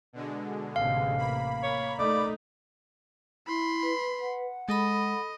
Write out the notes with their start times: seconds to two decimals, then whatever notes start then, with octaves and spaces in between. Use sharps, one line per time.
0.13 B2 D3 G#3
0.76 A1 C3 F5
1.17 A#3 B5
1.63 C#5
1.99 A3 D#4 D5
3.48 E4 B5 C6
3.83 B4
4.21 F#5
4.69 G#3 A4 D#5 B5